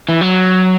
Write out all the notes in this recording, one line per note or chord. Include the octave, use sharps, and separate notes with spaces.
E3
F#3